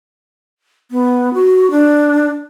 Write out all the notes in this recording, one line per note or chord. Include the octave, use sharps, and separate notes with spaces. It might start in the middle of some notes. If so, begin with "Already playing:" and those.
B3
F#4
D4